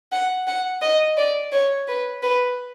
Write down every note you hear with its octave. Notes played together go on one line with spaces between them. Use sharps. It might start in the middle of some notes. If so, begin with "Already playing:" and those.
F#5
F#5
D#5
D5
C#5
B4
B4